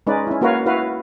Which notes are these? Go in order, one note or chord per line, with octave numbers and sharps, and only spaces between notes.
G#3 C#4 D#4 B4 D5
C#4 E4
A#3 F#4 A#4 B4 C#5 F5
E4 F#4 B4 F5